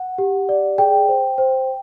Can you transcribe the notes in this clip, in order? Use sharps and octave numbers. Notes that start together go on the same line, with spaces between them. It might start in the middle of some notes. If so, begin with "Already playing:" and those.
Already playing: F#5
G4
D5
G#4 G5
C5
C5